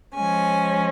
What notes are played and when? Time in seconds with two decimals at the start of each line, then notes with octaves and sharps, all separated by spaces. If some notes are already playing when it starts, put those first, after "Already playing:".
0.15 F3 G#3 C#4 G#5